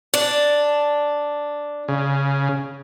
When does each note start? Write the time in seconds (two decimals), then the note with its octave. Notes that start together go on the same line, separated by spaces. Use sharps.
0.14 D4
1.88 C#3